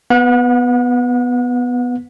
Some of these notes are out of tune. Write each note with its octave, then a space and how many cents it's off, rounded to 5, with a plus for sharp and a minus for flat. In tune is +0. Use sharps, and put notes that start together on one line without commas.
B3 +0 F#5 -35